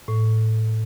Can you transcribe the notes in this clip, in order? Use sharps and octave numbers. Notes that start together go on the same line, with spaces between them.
A2